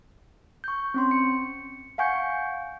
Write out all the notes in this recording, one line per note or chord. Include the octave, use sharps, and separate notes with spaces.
C#6 G6
C4 C#4 C6
C#7
F5 F#5 G#5 C#6 G6 C#7